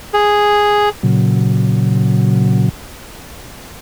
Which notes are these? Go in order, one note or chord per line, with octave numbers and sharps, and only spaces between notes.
G#4
A#2 C#3 F#3